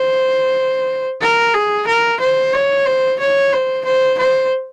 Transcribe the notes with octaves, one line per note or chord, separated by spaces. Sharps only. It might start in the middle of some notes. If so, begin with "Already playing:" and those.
Already playing: C5
A#4
G#4
A#4
C5
C#5
C5
C#5
C5
C5
C5